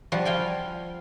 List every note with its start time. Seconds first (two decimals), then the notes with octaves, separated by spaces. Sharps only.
0.12 F3 G3 F#4
0.25 F4 F5 G5 G#5